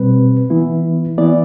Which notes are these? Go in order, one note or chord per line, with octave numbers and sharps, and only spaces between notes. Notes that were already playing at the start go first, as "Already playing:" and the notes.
Already playing: B2 G3 C4 B4
E3 B3 E4
E3 B3 E4 D5